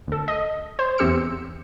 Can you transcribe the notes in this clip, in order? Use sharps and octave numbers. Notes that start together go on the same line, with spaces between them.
D2 A4
D#5
C5
E2 C4 G4 E6 C#7